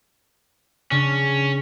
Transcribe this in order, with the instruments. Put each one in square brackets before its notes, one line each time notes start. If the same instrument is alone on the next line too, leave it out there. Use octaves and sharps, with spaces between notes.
[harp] C#3 D4 [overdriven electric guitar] C#4